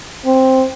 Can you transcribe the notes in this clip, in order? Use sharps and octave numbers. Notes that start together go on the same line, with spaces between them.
C4